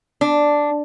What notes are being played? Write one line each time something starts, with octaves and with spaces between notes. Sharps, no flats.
D4